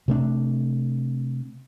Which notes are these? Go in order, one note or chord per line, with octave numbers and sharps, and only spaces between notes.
C3 A3 D4